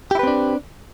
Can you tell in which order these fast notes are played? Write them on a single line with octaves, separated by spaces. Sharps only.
G4 E4 B4 C4 D4